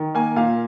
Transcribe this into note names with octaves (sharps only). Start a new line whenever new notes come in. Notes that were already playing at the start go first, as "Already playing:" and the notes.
Already playing: D#3
A#3 G#5
A#2 F5